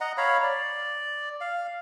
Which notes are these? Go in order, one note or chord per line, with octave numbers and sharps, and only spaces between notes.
D#5 F#5 A#5
C#5 F5 A#5 B5
D5
F5